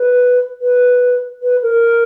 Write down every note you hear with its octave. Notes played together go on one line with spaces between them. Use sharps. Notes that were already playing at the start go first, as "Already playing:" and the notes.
Already playing: B4
B4
B4
A#4